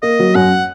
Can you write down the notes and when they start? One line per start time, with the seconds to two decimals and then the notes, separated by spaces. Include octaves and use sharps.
0.02 A#3 D#5
0.19 F#3
0.35 F#2 F#5